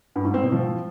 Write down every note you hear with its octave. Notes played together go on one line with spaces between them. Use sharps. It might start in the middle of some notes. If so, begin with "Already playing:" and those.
G2
G#2
C4
B2
F3